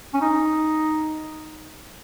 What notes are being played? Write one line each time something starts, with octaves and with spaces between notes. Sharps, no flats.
C#4
D#4